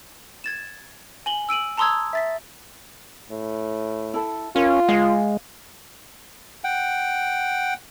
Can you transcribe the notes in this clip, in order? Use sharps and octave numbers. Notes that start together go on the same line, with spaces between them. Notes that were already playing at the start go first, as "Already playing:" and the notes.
G#6 A6 E7
G#5 F#7 G7
E6 D7 D#7 F#7
A5 A#5 C6 D#6 E6 G#6
E5 A6 B6
A2
E4 A4
C#4 F4 A#4
G#3 F5
F#5 G5